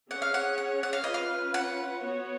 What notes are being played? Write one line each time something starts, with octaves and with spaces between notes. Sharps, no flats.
C#4 G#4 C#5 F#5
F5
F#5
F#5
F#5
F5
C#4 F4 B4 D#5
F5
F#5
B3 F#4 C#5